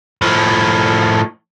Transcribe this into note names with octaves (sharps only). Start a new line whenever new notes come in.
A2 F3